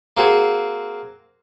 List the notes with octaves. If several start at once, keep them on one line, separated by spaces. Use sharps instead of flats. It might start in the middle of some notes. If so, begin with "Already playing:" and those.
A#3 C4 F#4 G#4